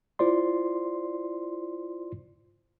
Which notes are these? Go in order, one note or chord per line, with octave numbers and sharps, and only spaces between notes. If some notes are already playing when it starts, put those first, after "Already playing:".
E4 F4 C5 D5 C6